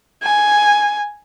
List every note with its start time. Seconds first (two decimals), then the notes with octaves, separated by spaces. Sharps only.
0.23 G#5